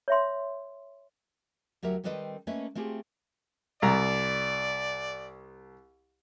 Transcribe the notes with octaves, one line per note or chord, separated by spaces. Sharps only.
C#5 E5 C6
D2 F#3 G4 A#4 E5
D#3 G3 C4 A4 B4 D#5
A3 A#3 C#4 B4 D#5 E5
A3 C4 F4 G4 G#4
C2 D5 A#5